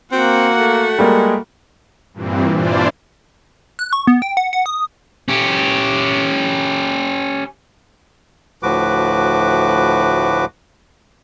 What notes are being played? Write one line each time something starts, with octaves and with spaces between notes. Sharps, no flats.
A#3 C4 F#4 F#5
A3
G3 G#3 A#3
G2 A#2 E3 C4
E3 D4 E4 F4 C5 D5
F#6
C#6
B3
G5
F#5
F#5
D#6
C#4 G4
D2 A2 F3 F#4 B4 D6